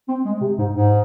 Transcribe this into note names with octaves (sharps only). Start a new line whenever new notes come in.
C4
G#3
C3
G#2
G#2